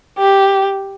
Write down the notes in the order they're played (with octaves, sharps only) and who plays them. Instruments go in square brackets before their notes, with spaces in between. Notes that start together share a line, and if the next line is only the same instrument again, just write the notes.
[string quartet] G4